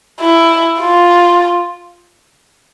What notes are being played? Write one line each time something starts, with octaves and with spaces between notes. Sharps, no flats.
E4
F4